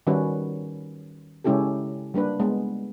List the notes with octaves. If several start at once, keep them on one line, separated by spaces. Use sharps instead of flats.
D#3 G3 C#4 F#4 B4
C#3 G#3 C#4 E4 G4 A4
G3 A#3 D4 B4
G#3 B3